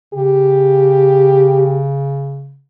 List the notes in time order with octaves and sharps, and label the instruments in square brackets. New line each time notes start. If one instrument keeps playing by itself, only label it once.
[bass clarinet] C#3 [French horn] G4